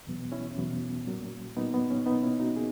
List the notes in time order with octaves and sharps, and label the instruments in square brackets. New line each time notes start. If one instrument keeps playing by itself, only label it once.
[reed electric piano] E2 B2 F#3 B3
C#4 E4
E2 B2 F#3 B3
A#2 F#3 A#3
A#2 F#3 A#3 B3 D#4
B3
C#4
B2 A#3 B3 D#4
C#4 E4
D#4 F#4
A#3 G#4